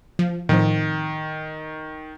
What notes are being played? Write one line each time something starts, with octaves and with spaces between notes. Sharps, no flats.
F3
A2 D#3 F3 C4